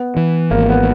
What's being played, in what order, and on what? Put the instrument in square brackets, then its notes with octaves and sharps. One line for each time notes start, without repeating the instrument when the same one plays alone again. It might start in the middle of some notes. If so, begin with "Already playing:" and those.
Already playing: [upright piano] B3
[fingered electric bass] E3
[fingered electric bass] G#1 [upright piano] A#3
[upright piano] B3